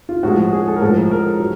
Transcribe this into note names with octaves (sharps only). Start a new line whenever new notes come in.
F4
A2 F3 G#3 F#4
G#4
A4
A#4
A2 F3 G#3 A4
A#4
F#3